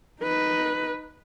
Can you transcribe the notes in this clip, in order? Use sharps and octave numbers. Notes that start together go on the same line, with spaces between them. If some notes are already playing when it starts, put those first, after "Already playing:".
D#4 B4